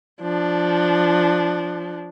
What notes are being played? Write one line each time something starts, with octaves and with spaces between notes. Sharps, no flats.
F3 D4